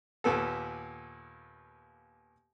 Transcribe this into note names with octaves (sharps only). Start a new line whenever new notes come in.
D#2 A#2 B3 A4